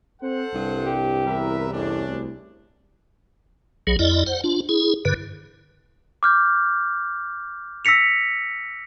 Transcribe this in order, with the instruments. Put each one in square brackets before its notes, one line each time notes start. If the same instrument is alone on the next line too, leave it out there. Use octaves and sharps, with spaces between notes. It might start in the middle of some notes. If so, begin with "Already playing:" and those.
[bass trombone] C4 [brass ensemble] A4 C5 F#5
[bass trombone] C2 [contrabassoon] G2
[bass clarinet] G4
[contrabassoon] E2 [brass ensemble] A#4 B4 E5
[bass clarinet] F2 [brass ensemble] C#4 D4
[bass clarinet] D2
[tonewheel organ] B1 F#3 G#4
F2 E4 D5 D#5
C5 F#5
D4 F4
E4 G#4
G2 D3 B4
[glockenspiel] D6 F6 G6
E6 A#6 B6 C#7 F7